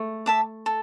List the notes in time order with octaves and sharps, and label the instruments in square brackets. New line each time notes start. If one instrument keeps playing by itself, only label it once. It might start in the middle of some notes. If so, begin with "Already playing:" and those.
Already playing: [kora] A3
[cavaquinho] E5 A5 D6
A4